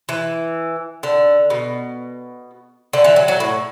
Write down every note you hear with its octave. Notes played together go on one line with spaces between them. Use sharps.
E3
D3
B2
D3
E3
F#3
F#3
A2